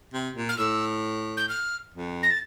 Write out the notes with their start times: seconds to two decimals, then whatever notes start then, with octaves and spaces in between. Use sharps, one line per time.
0.13 C3
0.36 A#2
0.49 F6
0.58 A2 E6
1.37 G6
1.49 F6
1.94 F2
2.23 A#6
2.31 A6